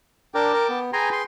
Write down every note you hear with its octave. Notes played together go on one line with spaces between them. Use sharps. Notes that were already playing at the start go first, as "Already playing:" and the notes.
D4 A#4 G5 A5 D6
A#4
B3
G#4 B4 G5 G#5 A#5 C6
C6